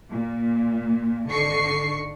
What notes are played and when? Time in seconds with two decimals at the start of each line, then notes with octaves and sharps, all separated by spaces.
0.11 A#2
1.28 G#1 D3 C#6 C7